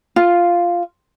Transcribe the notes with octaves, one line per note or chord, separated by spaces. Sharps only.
F4